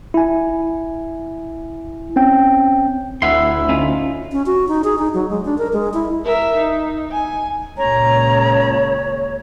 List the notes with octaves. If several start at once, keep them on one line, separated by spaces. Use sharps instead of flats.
E4 G#5
C4 C#4 G5
D2 E4 E5 F#5 C6
C#4 D#4 F4
C#4
F#4
D#4
G#4
D#4
F#3
G#3
D4
A#4
G#3
E4
A#4 E5
D#4
G#5
C#2 A#2 C#5 A#5